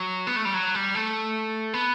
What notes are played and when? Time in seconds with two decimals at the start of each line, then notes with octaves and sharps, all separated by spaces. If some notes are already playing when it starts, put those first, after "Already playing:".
Already playing: F#3
0.27 B3
0.36 A3
0.45 G3
0.54 F#3
0.75 G3
0.95 A3
1.73 B3